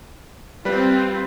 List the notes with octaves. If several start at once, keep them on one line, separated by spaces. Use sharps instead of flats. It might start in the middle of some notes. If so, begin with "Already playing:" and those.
G3 C4 F4 B4